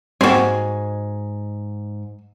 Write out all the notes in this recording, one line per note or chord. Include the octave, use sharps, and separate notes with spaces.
G#2 G3 A#3 C4 F#4 G#5